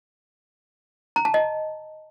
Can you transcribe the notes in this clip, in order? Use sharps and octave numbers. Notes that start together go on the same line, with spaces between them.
A#5
A5
D#5